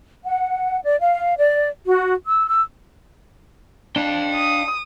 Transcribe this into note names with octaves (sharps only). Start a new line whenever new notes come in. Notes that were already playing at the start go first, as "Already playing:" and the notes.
F#5
D5
F5
D5
F#4
E6
E6
D4 F5 G5
D#6